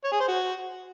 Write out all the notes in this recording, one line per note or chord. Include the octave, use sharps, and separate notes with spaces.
C#5
G#4
C5
F#4